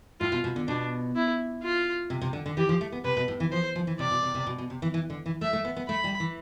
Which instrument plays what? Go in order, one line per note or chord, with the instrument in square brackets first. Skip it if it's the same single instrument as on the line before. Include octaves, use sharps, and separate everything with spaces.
[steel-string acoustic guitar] A2 [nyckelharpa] F4
[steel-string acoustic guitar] B2
B2
D3
[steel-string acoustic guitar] B2 [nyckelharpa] D4
[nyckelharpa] E4
F4
[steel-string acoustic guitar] C3
C3
D3
D3
[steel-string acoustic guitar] E3 [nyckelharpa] G4
[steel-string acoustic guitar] F3
A3
B3
[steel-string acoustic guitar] C3 [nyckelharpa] B4
[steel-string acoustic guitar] B2
A2
E3
[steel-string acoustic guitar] F3 [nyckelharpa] C5
[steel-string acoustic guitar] F3
E3
[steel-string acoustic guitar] C3 [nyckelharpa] D5
[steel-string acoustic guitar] B2
C3
C3
B2
B2
C3
E3
E3
D3
E3
[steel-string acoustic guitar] A3 [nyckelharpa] E5
[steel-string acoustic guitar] A3
B3
B3
[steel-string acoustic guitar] A3 [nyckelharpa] B5
[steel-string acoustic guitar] G3
E3